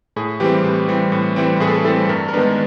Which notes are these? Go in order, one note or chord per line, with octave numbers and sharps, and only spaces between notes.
A2 G#4
E3 G3 C4 G4
A2
E3 G3 C4
A2
E3 G3 C4
A2 G#4
A4
G#4
E3 G3 C4 A4
G2 A#4
A#4
D#3 G#3 B3 D4 B4